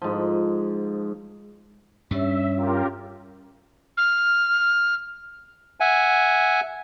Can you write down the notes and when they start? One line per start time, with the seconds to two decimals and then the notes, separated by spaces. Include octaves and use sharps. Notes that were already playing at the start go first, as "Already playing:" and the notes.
0.02 G#2 F3
2.11 G2 G3 C#4 C#5 E5
2.56 F4 G4 A#4
3.97 F6
5.80 E5 F#5 G#5